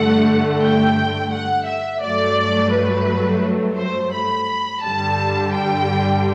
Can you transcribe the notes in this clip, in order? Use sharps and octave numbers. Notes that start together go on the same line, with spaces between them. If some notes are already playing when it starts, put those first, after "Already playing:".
Already playing: G2 D3 A3 F#5
G5
F#5
E5
G2 F#3 A3 D5
B4
C5
B5
G2 D3 G3 A5
G5